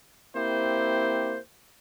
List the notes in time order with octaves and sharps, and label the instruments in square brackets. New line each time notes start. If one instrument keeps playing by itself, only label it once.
[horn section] A#3 C4 E4 G4 C5